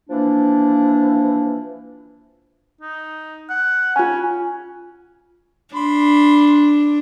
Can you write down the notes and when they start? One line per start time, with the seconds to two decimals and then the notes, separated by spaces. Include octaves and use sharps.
0.10 E3 F3 A#3 D4
2.81 D#4
3.49 F#5
3.96 C#4 F4 G#5
5.75 D4 B5 C6